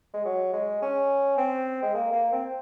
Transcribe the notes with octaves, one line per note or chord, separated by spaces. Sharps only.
G#3
F#3
G#3
C#4
C4
G#3
A#3
A#3
C4